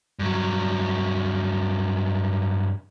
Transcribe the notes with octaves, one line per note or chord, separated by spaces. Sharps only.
G2 F#3